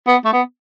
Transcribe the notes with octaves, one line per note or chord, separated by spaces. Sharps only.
B3
A3
B3